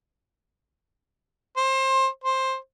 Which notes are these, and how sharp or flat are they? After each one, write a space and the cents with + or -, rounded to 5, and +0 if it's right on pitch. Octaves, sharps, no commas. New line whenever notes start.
C5 +25
C5 +10